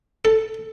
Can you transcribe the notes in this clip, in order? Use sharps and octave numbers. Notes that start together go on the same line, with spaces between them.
A4